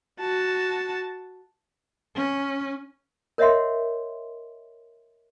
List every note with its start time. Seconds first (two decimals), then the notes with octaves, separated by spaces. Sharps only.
0.20 F#4 A5
2.16 C#4
3.38 A#4 C#5 D#5 E5 F#5 C6